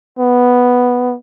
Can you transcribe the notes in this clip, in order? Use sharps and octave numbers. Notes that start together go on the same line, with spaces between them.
B3